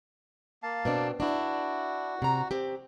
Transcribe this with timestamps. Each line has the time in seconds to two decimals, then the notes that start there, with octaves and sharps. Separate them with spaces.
0.63 A#3 F5 A5
0.85 B2 C4 D4
1.20 D4 E4 F#4
2.22 C3 A#5
2.51 C4 G4